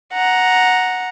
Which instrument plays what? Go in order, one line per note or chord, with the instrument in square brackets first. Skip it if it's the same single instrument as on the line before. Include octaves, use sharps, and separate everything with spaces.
[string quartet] F#5 A#5